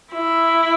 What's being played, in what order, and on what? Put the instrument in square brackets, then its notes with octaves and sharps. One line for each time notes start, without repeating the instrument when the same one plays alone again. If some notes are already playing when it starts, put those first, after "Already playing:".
[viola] E4